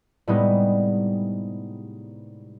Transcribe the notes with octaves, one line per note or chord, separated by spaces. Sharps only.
A2 C3 G3 G#3 B3 D#4